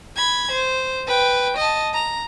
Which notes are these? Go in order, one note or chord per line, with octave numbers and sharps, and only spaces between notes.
B5 G#6
C5
B4 G5
D#5 A5
A#5